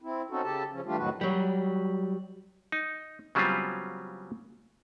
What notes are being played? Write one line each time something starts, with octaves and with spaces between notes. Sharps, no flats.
C4 E4
C4 C#4 D#4 F#4 A4
C#3 G4 A4 A5
C#3 F3 C#4
E3 G3 A3 D4 F4 G4
F2 A2 D#3 F#3 F#4 B4
F#3 G3
D#4
C#3 F#3 G3 B3 C4 F4